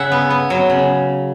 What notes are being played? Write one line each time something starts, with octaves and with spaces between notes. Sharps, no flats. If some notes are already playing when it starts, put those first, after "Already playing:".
Already playing: C#3 E5 F#5
B3
B3
F#3
C#3